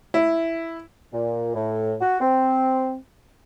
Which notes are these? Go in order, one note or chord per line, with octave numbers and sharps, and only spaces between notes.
E4
A#2
A2
F#4
C4